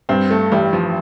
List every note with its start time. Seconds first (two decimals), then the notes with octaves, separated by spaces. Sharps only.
0.09 G2 C4
0.31 A3
0.52 A1 G3
0.73 F3